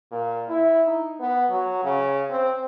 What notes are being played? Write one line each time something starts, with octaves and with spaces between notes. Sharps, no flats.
A#2
E4
D#4
B3
F#3
C#3
C4